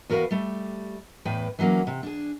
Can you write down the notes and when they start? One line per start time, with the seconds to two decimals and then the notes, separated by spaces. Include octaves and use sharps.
0.10 E2 F#4 A#4 B4 F5
0.31 G3 A3
1.25 E2 A2 B4 G5
1.59 E3 F#3 G3 A#3 C#4
1.87 C3
2.03 D4 G#4